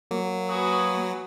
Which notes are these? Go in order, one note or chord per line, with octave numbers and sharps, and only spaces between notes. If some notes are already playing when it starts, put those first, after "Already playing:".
F#3 A#3
F#4 B4 G#5 D#6